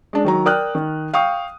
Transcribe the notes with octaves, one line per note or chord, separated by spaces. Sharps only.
G#3 D4
D#3 F#3 A#5
A#4 D5 G5 D#6 F6 F#6
D#3
F5 G5 C#6 D#6